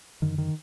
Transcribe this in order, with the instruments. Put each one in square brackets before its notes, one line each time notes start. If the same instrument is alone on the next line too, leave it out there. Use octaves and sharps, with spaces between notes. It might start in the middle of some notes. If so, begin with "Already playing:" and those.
[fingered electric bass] F#2 D3 D#3
D#3